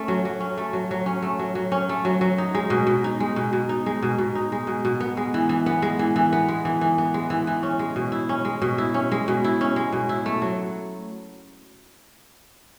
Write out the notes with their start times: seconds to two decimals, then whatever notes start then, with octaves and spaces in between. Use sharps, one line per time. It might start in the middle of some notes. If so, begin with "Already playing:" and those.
Already playing: A3 C#4
0.08 F#3
0.25 F#3
0.40 C#4
0.57 A3
0.73 F#3
0.91 F#3
1.06 C#4
1.22 A3
1.39 F#3
1.55 F#3
1.72 C#4
1.89 A3
2.05 F#3
2.21 F#3
2.38 D#4
2.55 G#3
2.70 B2
2.87 B2
3.04 D#4
3.20 G#3
3.36 B2
3.53 B2
3.69 D#4
3.86 G#3
4.02 B2
4.18 B2
4.35 D#4
4.52 G#3
4.67 B2
4.85 B2
5.00 B3
5.17 G#3
5.34 E3
5.49 E3
5.66 B3
5.82 G#3
5.99 E3
6.16 E3
6.33 B3
6.48 G#3
6.65 E3
6.81 E3
6.98 B3
7.14 G#3
7.30 E3
7.47 E3
7.63 C#4
7.79 G#3
7.96 B2
8.12 E4
8.29 C#4
8.45 G#3
8.62 B2
8.78 E4
8.94 C#4
9.12 G#3
9.28 B2
9.44 E4
9.61 C#4
9.76 G#3
9.92 B2
10.09 E4
10.26 A3
10.42 F#3